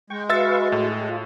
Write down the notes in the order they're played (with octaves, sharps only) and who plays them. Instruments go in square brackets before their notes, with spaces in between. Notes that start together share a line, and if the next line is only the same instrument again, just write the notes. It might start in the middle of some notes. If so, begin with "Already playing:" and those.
[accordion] G#3 [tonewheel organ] G5 C#6
[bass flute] F#4 [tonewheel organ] B4 F5 C#6 [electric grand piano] E5 E6 A6
[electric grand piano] A2 A4 [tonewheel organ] E4
[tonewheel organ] G#4
F4